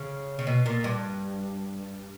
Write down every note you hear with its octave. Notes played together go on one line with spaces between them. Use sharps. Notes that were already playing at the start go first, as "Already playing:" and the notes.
Already playing: C#3
C#3
B2
A#2
G2